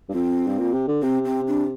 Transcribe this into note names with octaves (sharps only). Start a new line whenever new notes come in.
G2
F2 C4
G2
A#2
C3
D3
C3 C4
C4
D4